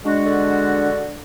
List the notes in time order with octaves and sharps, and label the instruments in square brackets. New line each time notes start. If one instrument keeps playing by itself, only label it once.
[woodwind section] G#3 F#4 [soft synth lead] D4
[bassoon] D3